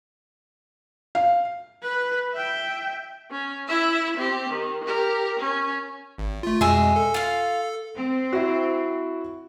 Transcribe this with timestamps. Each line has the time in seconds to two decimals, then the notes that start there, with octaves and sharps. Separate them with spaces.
1.15 F5
1.82 B4
2.33 E5 G5
3.31 C#4
3.68 E4 E5
4.17 C4 G4
4.50 D#3
4.85 G4 A#4
5.39 C#4
6.18 G#1
6.43 A3 F4
6.61 F2 B2 G#3 G#4 E5
6.96 A4
7.14 F4 F5
7.95 C4
8.33 E4 F#4